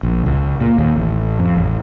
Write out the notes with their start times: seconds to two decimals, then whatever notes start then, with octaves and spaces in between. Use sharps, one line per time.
0.03 A#1
0.26 C#2
0.61 A#2
0.78 D#2
0.96 A1
1.39 F2
1.57 A1